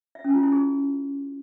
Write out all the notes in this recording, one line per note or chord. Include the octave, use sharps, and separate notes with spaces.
E5
C#4
F4
E4
G#4